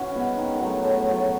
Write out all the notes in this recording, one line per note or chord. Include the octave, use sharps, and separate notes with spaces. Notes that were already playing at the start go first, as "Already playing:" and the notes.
Already playing: E3 C#4 F#4
G#3 B3
D#3
F#3 A3
A2
F#3 A3